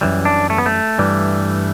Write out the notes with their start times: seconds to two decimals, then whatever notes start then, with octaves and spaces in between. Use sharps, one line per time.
0.01 F#2 E3 G3
0.25 D4
0.50 A3
0.58 B3
0.66 A3
0.98 G2 E3 G3